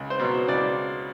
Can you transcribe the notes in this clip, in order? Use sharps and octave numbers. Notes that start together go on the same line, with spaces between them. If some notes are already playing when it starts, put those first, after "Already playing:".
Already playing: C#2
C5
B2 F#3 B3
C#2 D5